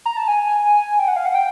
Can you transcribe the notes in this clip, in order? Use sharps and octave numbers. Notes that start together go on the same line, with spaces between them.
A#5
A5
G#5
G5
F#5
F5
F#5
G5